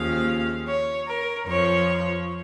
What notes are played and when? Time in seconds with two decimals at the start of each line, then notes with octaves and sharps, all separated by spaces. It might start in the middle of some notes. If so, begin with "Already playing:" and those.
Already playing: D#2 C#3 F3 F5
0.67 C#5
1.07 A#4
1.47 F2 F3 C#5